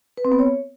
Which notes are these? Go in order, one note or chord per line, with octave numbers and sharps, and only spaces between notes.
B4
C4
B3
C#5